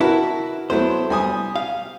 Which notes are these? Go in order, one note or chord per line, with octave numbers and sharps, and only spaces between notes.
E4 F#4 A#4 B4 A5
F#3 A3 B3 E4 C5
G3 G#5 D#6
F5